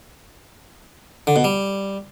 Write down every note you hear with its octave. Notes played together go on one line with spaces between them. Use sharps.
D3
B2
G3